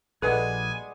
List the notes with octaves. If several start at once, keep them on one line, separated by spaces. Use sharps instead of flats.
A#1 F3 G3 G#3 A4 B4 F#5 G#5